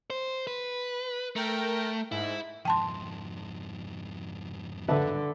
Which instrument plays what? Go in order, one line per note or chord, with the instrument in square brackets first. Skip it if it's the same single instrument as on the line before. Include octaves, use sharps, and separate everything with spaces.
[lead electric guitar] C5
B4
[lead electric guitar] A3 [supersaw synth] A#4 G5
[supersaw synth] G#2 [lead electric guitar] E4
[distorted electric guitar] F2 G#2 [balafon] G5 A5 C6
[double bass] D3 [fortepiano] B4 E5 A5